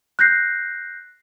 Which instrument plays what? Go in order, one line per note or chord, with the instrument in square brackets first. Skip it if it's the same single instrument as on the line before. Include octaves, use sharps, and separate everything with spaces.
[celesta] F#6 G6 A#6 C7